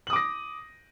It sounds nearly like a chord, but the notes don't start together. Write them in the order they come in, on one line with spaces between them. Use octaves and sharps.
F#7 D#6 D6 A#6